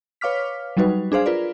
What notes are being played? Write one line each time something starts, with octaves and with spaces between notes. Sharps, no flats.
B4 C#5 F5 D6 F6 B6
F#3 G3 D#4 F#4 B4
D4 G#4 C5 F5
F4 A#4 B4 D5